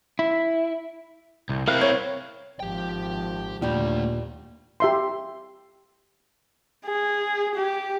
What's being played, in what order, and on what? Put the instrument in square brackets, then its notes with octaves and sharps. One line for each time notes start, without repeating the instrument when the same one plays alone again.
[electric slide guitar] E4
[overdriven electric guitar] C2
[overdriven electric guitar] C4 E4 [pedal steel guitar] A#4 F5 F#6
[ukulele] C#5
[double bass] G#1 F3 [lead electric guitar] G4 G5
[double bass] D#2 [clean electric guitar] A#2 [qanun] G3 G4 [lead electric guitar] A3 D4
[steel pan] G4 E5 C6
[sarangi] G#4
G4